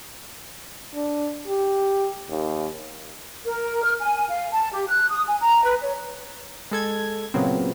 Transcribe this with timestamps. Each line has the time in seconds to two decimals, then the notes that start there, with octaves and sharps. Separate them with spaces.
0.95 D4
1.47 G4
2.30 D#2
3.45 A#4
3.84 F6
4.00 G#5
4.29 F5
4.53 A5
4.72 G4
4.89 F#6
5.10 D#6
5.27 G#5
5.40 A#5
5.64 B4
5.81 C#5
6.71 G#3 A4 G#6
7.34 A#2 C#3 F#3 B3 C4